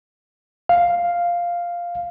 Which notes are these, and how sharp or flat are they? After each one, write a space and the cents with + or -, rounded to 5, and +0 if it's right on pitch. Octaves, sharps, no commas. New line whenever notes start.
F5 +0